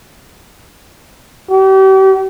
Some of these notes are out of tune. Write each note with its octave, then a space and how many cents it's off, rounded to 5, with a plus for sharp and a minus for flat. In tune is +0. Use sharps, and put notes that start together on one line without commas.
G4 -40